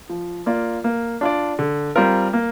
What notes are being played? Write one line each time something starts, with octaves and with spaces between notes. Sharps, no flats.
F3
A#3 F4 D5
A#3
D4 F4 D5
D3
G3 C4 F4 A#4
A#3